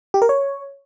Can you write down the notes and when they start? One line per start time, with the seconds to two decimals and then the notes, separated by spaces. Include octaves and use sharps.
0.14 G4
0.22 A#4
0.29 C#5